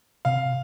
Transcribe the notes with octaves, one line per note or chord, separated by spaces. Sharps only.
C3 F5